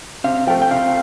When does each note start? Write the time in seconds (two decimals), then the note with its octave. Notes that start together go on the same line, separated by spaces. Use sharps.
0.24 C3 F5
0.47 F3 A3 G5
0.62 G5
0.71 C3 F5